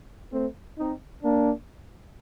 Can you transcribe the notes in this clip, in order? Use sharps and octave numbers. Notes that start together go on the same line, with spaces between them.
A3 C4
C4 D#4
A#3 D4